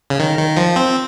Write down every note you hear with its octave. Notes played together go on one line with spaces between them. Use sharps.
C#3
D#3
D#3
F3
C4